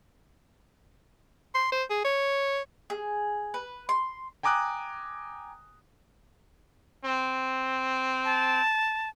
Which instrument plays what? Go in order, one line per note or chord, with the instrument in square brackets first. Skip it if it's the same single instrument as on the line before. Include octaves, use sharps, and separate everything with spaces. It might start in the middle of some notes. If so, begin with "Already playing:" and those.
[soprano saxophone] C6
C5
G#4
C#5
[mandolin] G#4
B4
C6
[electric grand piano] G5 G#5 A#5 D6 D#6 F#6
[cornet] C4
[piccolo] A5